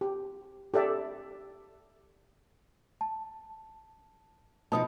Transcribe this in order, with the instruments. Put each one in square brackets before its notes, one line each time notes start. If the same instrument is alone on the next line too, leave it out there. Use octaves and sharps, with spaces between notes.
[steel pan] G4
G4 A4 D5 E5
[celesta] A5
[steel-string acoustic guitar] B2 F3 D#4 [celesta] A5 D#6